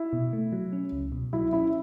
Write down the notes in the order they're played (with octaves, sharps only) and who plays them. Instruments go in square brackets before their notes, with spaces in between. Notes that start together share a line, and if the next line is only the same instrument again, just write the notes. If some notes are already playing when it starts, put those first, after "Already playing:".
Already playing: [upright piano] E4
[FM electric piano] B2
A3
F#3
C#4
C#2
B2
[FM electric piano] F#3 [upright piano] E4
[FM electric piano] C#4 [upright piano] E4